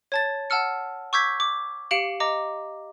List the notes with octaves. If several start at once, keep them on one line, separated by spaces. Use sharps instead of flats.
C#5 A5 A6
F#5 A5 E6 F6 C#7
C#6 D6 E6 G6 G#6 B6
D6
G4 F5 C#7 D7 F#7
D#5 A#5 D6